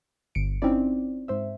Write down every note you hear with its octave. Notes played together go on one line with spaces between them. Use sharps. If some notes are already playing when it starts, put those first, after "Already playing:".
G1 C#7 D7
C4 C#4 D#4 E4 D5
G#2 C5 E5